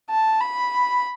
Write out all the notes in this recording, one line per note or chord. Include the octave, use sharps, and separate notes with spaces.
A5
B5